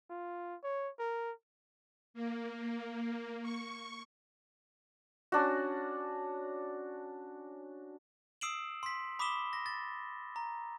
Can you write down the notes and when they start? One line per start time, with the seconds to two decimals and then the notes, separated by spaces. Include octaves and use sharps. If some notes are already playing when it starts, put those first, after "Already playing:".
0.10 F4
0.64 C#5
0.99 A#4
2.14 A#3
3.42 C#6
5.32 C#4 D4 F#4
8.41 D#6 E6 C7 D7 E7 F#7
8.83 C6 B6
9.19 B5 D6 D#6 B6 E7 G7
9.53 A#6
9.66 A6
10.36 A#5